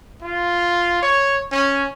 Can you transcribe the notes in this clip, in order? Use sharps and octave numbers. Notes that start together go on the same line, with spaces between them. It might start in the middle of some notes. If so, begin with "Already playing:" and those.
F4
C#5
C#4